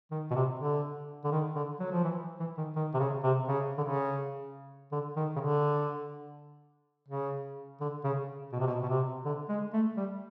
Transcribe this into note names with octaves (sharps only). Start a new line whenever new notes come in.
D#3
B2
C3
D3
D3
D#3
D3
F#3
F3
E3
E3
D#3
D#3
C3
C#3
C3
C#3
D3
C#3
D3
D#3
C#3
D3
C#3
D3
C#3
B2
C3
B2
B2
C3
D3
G#3
A3
G3